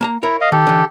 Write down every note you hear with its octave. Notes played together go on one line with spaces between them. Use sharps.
A#3 A5 A#5
E4 A#4 C#5
D#5 F5
D#3 G4 A4
D3 E3